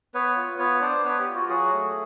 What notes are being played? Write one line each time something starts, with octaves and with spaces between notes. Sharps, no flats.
B3 B4 C#5
F4
B3 B4 C#5
D4 C5 D5
B3 B4 C#5
G4
F4
F#4
F#3 F#4 G#4
A3